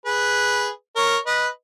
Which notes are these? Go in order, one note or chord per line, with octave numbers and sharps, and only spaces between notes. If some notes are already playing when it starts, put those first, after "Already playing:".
G#4 B4
A#4 C#5
B4 D#5